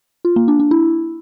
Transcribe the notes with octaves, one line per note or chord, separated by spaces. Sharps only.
F4
A#3
D4
D4
E4